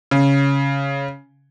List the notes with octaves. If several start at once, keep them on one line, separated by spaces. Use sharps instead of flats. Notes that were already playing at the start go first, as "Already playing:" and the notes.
C#3